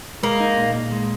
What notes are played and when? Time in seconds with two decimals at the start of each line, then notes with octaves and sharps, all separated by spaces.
0.23 G#3 A#3
0.40 D#4
0.57 A#2
0.74 A#2
0.92 G#3